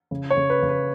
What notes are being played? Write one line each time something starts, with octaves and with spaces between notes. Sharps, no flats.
C#3
C#5
C#3
B4
C#3
B4